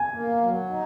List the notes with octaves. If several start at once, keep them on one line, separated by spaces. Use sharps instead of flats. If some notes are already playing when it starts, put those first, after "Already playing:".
Already playing: G#5
A#3
F#3
D#4